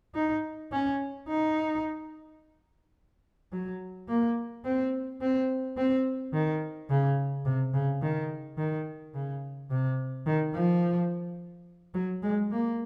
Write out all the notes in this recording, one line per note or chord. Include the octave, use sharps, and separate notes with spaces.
D#4
C#4
D#4
F#3
A#3
C4
C4
C4
D#3
C#3
C3
C#3
D#3
D#3
C#3
C3
D#3
F3
F#3
G#3
A#3